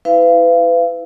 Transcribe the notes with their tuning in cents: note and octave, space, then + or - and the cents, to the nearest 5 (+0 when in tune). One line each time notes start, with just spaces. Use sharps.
E4 -15 B4 +35 F5 -35